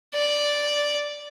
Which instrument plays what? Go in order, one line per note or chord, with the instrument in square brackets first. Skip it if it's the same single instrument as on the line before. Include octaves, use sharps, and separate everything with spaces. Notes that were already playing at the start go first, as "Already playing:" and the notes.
[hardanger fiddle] D5